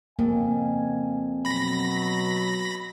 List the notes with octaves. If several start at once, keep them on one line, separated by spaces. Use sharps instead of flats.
F2 C#3 A#3 F5 G#5
B2 F#3 B5 A#6